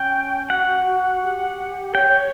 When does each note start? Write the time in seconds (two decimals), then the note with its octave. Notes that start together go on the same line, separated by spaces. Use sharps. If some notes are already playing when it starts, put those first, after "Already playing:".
Already playing: C#4 G5
0.50 F#4 F#5
0.86 F#4
1.22 G4
1.94 C#5 G5